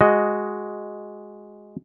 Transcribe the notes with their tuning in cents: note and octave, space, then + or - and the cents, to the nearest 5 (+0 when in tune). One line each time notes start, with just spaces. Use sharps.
G#3 +0 F#4 +0 D#5 +0